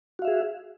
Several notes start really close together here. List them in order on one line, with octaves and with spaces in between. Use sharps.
F#4 F5 E5 G#4